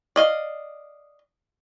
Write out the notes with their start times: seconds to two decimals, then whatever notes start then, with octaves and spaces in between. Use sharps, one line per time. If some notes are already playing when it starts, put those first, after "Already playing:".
0.16 D5 D#5 F5